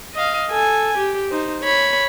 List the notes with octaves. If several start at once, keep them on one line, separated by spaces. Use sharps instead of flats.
D#5 F5
A4 G#5
G4
D#4 C5
C#5 B5